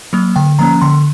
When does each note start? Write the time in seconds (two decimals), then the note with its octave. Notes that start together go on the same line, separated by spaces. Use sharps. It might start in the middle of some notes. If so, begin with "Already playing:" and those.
0.13 F#3 A#3
0.36 D3 G5
0.59 F3 A#3 C#4 A#5
0.81 D3 C6